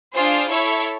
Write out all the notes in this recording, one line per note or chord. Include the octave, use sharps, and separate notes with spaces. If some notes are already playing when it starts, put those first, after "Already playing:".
D4 F4 G#4 C5
E4 A4 C#5 E5